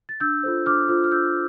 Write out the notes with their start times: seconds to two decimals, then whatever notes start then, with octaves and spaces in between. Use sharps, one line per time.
0.09 A6
0.20 D4 E6 G6
0.43 F4 A4 C5
0.66 D4 D6 F6
0.89 F4 A4 C5
1.04 F6
1.12 D4 E6 G6